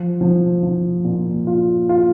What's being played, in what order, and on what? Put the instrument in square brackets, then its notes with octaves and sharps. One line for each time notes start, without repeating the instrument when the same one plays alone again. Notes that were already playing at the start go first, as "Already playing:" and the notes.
Already playing: [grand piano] F3
F3
F3
A#2
F4
F4